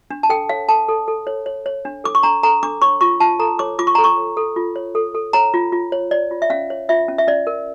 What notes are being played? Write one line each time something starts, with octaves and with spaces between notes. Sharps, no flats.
D4
A5
A4 G5
C#5 F5
A4 A5
A4
A4
C#5
C#5
C#5
D4
A4 D6
C#6
D4 A#5
A4 A#5
D4 D6
C#5 C#6
F4 C#6
F4 A5
A4 A#5
C#5 D6
F4 D6
C#6
A4 A#5
C#6
C#5
A4
F4
C#5
A4
A4
C#5 A#5
F4
F4
C#5
C#5 D5
F4
E5
C#4 F5
C#5
F4 E5
C#4
E5
C#4 D5
A#4